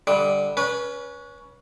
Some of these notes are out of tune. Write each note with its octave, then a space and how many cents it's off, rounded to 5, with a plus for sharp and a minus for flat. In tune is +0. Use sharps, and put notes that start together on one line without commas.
D3 +0 G3 +0 D#5 +45
C#4 +15 B4 -25